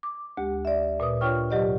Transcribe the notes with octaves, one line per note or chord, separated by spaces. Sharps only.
D6
D2 G#3 G4
D5 E5
A#2 B4 D#6
D4 F4 C#5 G5 C#6 F6
G#2 C3 F#3 G4 D5 D#5